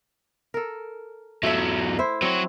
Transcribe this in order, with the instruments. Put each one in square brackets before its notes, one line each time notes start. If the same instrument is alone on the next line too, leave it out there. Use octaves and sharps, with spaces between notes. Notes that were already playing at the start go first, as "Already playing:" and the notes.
[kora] A4 A#4
[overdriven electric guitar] E2 F#3 [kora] A3 E5
[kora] E4 C5
[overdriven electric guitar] F#3 C#5 [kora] C4